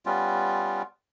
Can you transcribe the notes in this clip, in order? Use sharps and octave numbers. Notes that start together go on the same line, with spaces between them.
G3 B3 C#4 F4